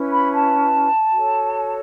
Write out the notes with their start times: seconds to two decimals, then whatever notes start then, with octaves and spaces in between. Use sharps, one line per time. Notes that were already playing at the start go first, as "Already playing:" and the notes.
Already playing: C#4 E4 B4
0.10 B5
0.31 A5
1.13 F#4 A4 C#5